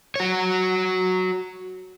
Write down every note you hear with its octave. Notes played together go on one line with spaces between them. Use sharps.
F#4 C#5